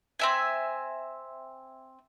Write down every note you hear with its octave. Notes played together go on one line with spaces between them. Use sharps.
C4 E5 G#5